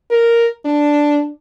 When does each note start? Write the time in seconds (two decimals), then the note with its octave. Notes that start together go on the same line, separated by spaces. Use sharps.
0.11 A#4
0.65 D4